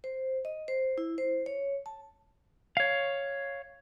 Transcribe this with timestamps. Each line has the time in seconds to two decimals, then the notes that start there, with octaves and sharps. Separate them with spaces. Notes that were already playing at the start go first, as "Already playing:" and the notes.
0.04 C5
0.45 D#5
0.68 C5
0.98 E4
1.18 C5
1.46 C#5
1.86 A5
2.77 C#5 F5